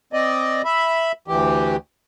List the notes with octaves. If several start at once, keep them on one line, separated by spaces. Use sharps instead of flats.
C4 D5 D#5
E5 B5
D2 E3 G4